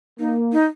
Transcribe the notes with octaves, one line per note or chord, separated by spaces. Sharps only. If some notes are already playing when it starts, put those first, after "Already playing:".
A#3 D#4
D#4